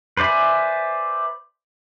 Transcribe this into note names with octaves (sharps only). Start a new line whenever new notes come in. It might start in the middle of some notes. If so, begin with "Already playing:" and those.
B4 C5 D5 E5 G#5